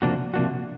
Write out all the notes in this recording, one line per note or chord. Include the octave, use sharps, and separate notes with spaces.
C3 F3 A#3 D4 F#4
C3 F3 A#3 D4 F#4